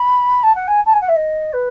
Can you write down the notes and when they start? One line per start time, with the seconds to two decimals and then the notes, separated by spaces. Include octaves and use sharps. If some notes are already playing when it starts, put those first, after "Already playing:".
Already playing: B5
0.43 A5
0.55 F#5
0.67 G#5
0.86 A5
0.93 G#5
1.01 F#5
1.08 E5
1.16 D#5
1.53 B4